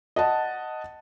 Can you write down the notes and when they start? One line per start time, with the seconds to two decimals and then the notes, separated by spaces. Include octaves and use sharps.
0.16 D#5 F#5 A5